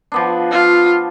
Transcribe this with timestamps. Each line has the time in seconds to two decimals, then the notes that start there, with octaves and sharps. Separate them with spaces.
0.12 F3 B3 D4
0.51 F4